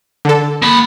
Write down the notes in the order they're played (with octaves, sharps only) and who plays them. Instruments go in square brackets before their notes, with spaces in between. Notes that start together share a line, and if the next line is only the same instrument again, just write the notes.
[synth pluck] D3 A4
[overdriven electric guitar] A#3 B5